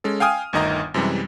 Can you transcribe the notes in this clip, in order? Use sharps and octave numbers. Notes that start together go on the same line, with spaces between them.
G#3 C#4 A4
F5 G5 G#5 D#6 F6
G1 D2 D#3 D#5 A#5
F#2 C3 E3 G3 G#3